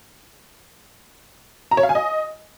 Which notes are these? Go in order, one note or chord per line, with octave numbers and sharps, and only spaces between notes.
A#5
C#5
F5
G#5
D#5